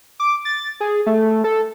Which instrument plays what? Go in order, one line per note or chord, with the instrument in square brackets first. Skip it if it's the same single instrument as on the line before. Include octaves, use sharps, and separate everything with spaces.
[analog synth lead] D6
A6
G#4
A3
A4